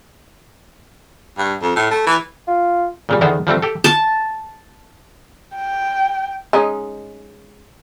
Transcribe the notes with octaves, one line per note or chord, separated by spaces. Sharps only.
G2
F2
A2
A3
E3
F4
A#2 C#3 G3
E2 D3 D#3 B3 C5
F3 G3 A3 C4
G4 A4
A5
G5
G#3 C#4 D#4